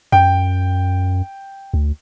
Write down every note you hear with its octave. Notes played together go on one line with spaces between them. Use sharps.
F#2 G5
D2